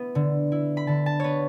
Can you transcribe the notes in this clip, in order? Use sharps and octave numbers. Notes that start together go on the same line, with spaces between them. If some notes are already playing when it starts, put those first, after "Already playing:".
Already playing: B3 E4
D3
E4
B5
D3 A5
A5
B3 B4 C#5